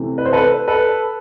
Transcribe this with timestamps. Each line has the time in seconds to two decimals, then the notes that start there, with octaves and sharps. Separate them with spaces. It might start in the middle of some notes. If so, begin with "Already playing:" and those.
Already playing: C3 E3 A3
0.18 B4
0.25 C5
0.33 A4 B4
0.68 A4 B4